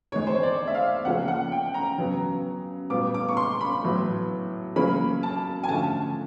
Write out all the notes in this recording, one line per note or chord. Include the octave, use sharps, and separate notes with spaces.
C3 D#3 G#3 C#5
C5
C#5
D5
E5
F5
C#3 F3 A#3 C#4 F#5
F#5
G5
A#5
C#3 F#3 B3
A#2 G3 B3 D6
D6
C#6
C6
B5
A2 F#3 B3
C#3 F#3 A#3 C#4 B5
A5
G#5
D3 F3 A3 C#4 A5